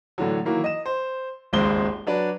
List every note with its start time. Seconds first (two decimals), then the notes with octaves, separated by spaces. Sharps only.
0.18 A2 D3 E3 F#3
0.45 D#3 E3 F#3 A#3 E4
0.64 D#5 E7
0.86 C5
1.53 D#1 G#1 C#2 G#3 C5 G7
2.07 F#3 D4 B4 D5